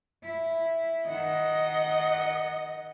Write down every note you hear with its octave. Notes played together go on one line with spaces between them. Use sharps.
E4
D#3 D#5 F#5